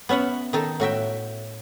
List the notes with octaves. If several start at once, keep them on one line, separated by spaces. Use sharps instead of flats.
B3 C#4 E5 F#5
D#3 D#4 A4
A2 F#4 E5 G5